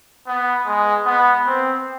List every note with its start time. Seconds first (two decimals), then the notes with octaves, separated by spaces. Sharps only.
0.27 B3
0.66 G#3
1.06 B3
1.46 C4